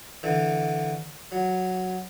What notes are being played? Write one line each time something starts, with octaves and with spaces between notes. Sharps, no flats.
D3 E3
F#3